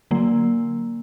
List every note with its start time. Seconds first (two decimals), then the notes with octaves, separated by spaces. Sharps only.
0.11 D3 F#3 A#3